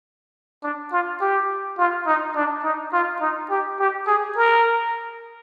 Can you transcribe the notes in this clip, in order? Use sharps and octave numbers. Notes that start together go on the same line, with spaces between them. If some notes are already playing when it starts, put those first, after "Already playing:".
D4
F4
G4
F4
D#4
D4
D#4
F4
D#4
G4
G4
G#4
A#4